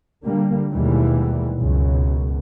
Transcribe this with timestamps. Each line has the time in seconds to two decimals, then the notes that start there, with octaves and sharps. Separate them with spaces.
0.25 D3 G3 A#3
0.72 D#2 B2 E3 G3 G#3
1.57 C#2 F#2 B2